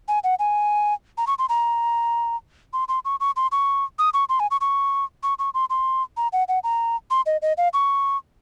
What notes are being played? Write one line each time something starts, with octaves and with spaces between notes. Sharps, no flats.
G#5
F#5
G#5
A#5
C#6
C6
A#5
C6
C6
C#6
C#6
C6
C#6
D#6
C#6
C6
G#5
C#6
C#6
C#6
C#6
C6
C6
A#5
F#5
F#5
A#5
C6
D#5
D#5
F5
C#6